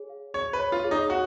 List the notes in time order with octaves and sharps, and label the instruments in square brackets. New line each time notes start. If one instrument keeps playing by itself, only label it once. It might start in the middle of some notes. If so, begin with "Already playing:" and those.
Already playing: [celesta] G#4 C#5
F5
[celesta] G#4 [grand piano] C#5
[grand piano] B4
[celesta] C#5
[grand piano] F4
[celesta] G#4
[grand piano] D#4
[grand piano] F#4 [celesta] F5